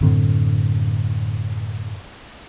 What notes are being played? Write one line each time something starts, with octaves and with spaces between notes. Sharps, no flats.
F#2 A2 D3 C4